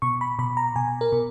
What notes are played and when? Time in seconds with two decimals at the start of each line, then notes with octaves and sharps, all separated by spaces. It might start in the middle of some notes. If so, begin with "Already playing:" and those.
0.02 B2 C#6
0.21 B5
0.39 B2 B5
0.57 A#5
0.76 B2 G#5
1.01 A#4
1.12 B2